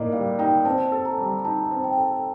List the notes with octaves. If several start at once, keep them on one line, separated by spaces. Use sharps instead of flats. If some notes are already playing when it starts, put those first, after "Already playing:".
Already playing: A2 A#3 D#4 D5 D#5
G3 F5
D#4 G5
C4 A5
A4
A#5
G3
D#4 A5
C4
G5
A4